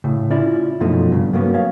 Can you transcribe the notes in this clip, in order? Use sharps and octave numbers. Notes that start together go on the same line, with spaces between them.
A2 C#3
C#4 E4 F4 D5
F#2 B2 F3 A3 D#4
G2 C#3
F#3 A#3 B3 C#4
C#5 F5